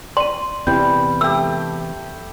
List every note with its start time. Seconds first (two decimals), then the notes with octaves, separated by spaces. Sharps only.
0.17 D5 C6 D#7
0.67 E2 C3 E3 G3 G6
1.21 A3 G4 E6